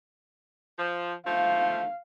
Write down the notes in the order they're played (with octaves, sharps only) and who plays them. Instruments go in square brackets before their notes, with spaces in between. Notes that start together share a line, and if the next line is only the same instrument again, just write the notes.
[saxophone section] F3
[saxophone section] F3 A3 [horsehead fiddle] F5